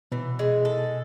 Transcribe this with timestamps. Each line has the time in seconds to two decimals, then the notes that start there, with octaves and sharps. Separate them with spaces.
0.12 B2 E3
0.39 G#3
0.65 A4